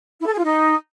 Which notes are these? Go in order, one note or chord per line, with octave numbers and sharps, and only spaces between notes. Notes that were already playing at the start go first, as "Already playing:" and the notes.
E4
A4
G#4
F4
D#4